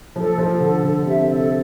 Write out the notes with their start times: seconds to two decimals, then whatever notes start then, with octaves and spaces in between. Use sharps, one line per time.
0.16 F3 A4
0.38 F3 F4
0.60 D3 A4
0.83 D3 A4
1.05 C3 E5
1.28 A4